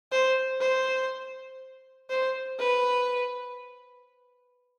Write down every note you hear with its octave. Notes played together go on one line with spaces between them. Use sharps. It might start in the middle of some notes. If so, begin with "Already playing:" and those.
C5
C5
C5
B4